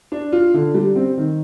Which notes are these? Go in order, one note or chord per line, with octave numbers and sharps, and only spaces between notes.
D4
F4
D3
G3
C4
D#3